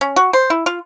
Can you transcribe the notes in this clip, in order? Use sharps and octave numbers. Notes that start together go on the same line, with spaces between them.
C#4
F#4
C5
E4
F4